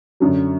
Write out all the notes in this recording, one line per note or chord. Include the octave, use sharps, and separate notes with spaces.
F#2 D3 F#3